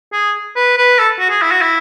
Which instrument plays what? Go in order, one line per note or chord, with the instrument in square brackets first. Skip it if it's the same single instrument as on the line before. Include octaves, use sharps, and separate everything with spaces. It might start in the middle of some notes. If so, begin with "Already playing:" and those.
[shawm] G#4
B4
B4
A4
F#4
G#4
E4
F#4
E4